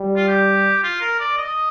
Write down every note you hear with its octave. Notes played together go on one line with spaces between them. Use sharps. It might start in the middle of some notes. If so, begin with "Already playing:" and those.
Already playing: G3
F4
G4
F4
A#4
D5
D#5